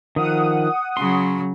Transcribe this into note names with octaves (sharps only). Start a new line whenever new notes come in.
D#3 F3 F#5 D#6
C#3 F#3 C6